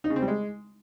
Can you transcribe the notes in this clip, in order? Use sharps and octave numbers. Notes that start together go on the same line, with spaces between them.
D#4
C#3
C4
G3
G#3